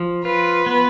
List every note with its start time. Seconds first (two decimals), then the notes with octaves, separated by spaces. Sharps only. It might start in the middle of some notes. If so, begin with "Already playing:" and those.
Already playing: F3
0.25 F4 B4
0.66 B3